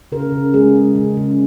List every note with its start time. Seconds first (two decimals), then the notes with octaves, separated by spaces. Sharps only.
0.12 C#3 A#4
0.32 C#3
0.54 G#3 G#4
0.75 G#3
0.95 C#3
1.17 C#3